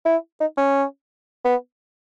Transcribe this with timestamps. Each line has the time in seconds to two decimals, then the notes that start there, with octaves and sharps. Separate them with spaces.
0.06 E4
0.40 D#4
0.58 C#4
1.45 B3